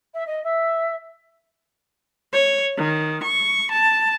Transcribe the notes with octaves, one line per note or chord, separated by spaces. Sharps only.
E5
D#5
E5
C#5
D#3
C#6
A5